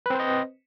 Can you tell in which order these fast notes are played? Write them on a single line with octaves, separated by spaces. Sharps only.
B4 C4 C5 D#5